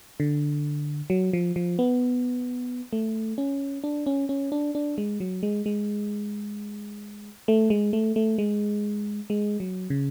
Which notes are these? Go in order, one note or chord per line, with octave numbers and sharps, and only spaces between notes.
D3
F#3
F3
F3
B3
A3
C#4
D4
C#4
C#4
D4
D4
G#3
F#3
G#3
G#3
A3
G#3
A3
A3
G#3
G#3
F#3
C#3